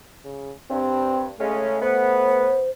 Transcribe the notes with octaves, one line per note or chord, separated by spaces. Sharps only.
C#3
G2 C4
C#3 G#3 A3 C#4
B3 C5